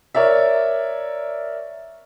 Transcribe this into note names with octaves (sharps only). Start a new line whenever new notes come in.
A#4 C#5 D5 E5